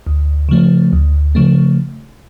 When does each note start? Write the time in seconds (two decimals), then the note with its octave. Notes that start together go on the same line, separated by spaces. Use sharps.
0.07 D2
0.49 C#3 F3 A3
0.93 D2
1.35 C#3 F3 A3